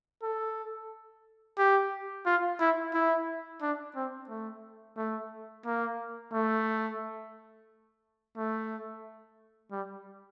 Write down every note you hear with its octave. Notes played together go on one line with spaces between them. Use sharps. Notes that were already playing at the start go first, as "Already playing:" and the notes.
A4
G4
F4
E4
E4
D4
C4
A3
A3
A#3
A3
A3
G3